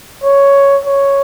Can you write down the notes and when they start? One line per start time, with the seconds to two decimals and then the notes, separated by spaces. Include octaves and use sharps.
0.23 C#5
0.84 C#5